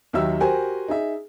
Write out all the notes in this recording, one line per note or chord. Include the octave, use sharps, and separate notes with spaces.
D#2 D#3 F#3 E5 E6
F#4 G4 A#4 C5 G#5
D#4 G#4 E5